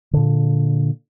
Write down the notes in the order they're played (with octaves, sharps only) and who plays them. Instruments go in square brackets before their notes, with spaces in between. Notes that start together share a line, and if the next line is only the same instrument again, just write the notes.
[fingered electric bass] A#2 D3